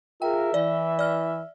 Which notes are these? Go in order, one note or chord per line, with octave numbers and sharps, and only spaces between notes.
F4 G#4 A#4 E5 G5
E3 D5
D5 F6